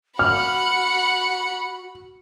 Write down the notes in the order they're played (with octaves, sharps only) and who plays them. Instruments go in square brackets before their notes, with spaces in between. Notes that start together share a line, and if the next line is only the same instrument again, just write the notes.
[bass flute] F#4 [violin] F#5 B5 [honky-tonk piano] F6